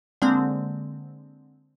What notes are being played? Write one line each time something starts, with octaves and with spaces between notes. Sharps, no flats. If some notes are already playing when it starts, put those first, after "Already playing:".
D3 G#3 A#3 C4